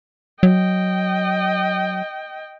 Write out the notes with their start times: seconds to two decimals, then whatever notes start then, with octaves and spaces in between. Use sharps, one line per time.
0.43 F#3 D#5 G5